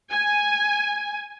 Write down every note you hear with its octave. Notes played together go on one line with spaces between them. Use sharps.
G#5